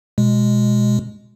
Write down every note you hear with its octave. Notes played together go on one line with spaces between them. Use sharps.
B2 G#3